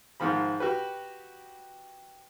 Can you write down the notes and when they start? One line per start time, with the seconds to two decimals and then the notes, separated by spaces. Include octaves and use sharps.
0.20 G#2 D#3 F3 B5
0.60 F#4 G4 B4